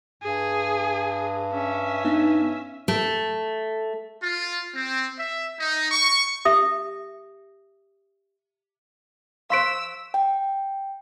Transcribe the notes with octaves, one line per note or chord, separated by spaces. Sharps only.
G2 G#4
C#4 E5
B3 D4 D#4
A3
F4
C4
E5
D#4
C#6
G4 E5 D#6
C5 F5 C6 C#6 E6 B6 D7
G5